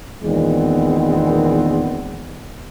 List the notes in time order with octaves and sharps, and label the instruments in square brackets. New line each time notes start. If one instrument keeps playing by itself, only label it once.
[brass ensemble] E2 A#2 D#3 G#3 B3 C4